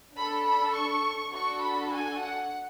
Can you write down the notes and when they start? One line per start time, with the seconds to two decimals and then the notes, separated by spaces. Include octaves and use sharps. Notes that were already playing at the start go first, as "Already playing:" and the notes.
0.14 D4 A4 B5
0.44 B5
0.74 C#6
1.33 D4 F#4 A4 C#6
1.62 B5
1.93 G#5
2.23 F#5